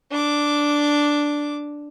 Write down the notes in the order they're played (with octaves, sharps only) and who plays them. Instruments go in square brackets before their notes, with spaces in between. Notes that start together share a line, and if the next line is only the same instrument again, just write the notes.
[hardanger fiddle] D4 D6